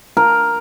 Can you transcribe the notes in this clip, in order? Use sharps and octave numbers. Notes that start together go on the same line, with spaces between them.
A#4